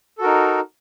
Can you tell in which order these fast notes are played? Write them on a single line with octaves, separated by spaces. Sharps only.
A4 F#4 A#4 D#4